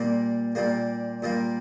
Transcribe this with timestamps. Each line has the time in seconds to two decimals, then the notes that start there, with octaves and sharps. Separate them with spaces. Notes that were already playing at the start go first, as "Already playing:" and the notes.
Already playing: A#2 G3 A#3
0.55 A#2 G3 A#3
1.22 A#2 G3 A#3